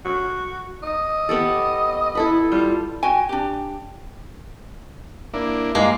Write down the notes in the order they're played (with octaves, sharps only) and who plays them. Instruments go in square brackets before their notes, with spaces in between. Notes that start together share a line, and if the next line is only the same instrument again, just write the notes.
[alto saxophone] F#4
D#5
[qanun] B3 G4 A4
E4 A4 B4
[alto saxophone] G3 [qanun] F4
[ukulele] F#4 G5 G#5
D4 G4
[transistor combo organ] A#3 D4 E4
[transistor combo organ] G2 D5 A#5 [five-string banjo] G#3 A#3